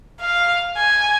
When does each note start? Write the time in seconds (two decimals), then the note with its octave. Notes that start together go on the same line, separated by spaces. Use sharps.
0.20 F5
0.76 G#5